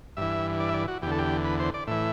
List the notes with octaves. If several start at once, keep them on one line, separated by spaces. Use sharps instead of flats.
G2 E3 E5
D5
E5
D5
F#4
E2 D3 G4 A4
G4
B4
C5
D5
A2 E3 E5